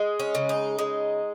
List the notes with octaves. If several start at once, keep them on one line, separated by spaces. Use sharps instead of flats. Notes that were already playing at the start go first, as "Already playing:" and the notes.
Already playing: G#3
C#4
C#3
D#4
G#3